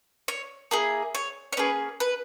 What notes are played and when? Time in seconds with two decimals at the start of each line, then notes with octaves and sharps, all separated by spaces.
0.28 C#5
0.71 A#3 E4 G#4
1.15 C#5
1.52 C#5
1.57 A#3 C#4 G#4 B4
2.00 B4